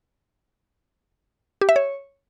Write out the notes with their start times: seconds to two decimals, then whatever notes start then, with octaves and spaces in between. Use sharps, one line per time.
1.61 G4
1.69 E5
1.76 C#5